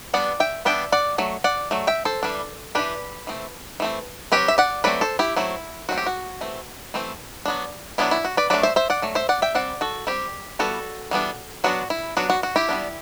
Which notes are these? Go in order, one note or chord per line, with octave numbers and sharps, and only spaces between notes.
G3 B3 D4 D5 F#5
E5 G5
G3 B3 D4 E5 G5
D5 F#5
F#3 A3
D5 F#5
F#3 A3
E5 G5
A4 C5
E3 G3 D4
E3 G3 D4 G4 B4
E3 A3 C4
E3 A3 C4
F#3 A3 C4 G4 B4
E5
D5 F#5
F#3 A3 C4 B4 D5
A4 C5
E4 G4
F#3 A3 C4 E4
F#3 A3 C4 F#4
G4
F#4
E3 A3 C4
E3 A3 C4
F#3 B3 D4
F#3 B3 D4 E4
E4
F#4
B4 D5
F#3 A3 D4 B4 D5
C5 E5
C5 E5
D5 F#5
F#3 A3
C5 E5
D5 F#5
E5 G5
G3 C4 D5 F#5
F#4 A4
G3 C4 E4 G4
E3 G3 B3 F#4 A4
E3 G3 B3 D4
F#3 B3 D4 F#4
E4
F#3 B3 D4 F#4
F#4
F#4
E4 G4
G3 B3 D4